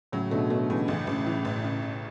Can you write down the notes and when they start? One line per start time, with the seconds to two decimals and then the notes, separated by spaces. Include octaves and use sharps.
0.12 A2 C#3 F#3
0.31 B2 D3 A3
0.50 B2 D3 A3
0.69 A2 C#3 E3
0.88 A1 C#3 E3
1.07 A1 A2 C#3
1.26 E3
1.45 A1
1.64 C#3
1.83 C#3